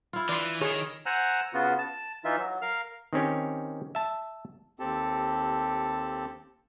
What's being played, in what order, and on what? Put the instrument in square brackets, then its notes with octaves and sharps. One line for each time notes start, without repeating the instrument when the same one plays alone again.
[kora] E4 F4
[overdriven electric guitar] E3 [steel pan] D5 C6
[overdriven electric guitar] D#3 [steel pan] G#4 C#5
[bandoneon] C5 F#5 G#5 A#5 E6 F#6
C#3 B3 F4 F#4
A5
E3 D#4 F4 E5
F#3
A#4 F5 F6
[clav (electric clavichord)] D#3 C4 C#4 G4
E5 A5
[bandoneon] D#2 C4 G4 A4 A5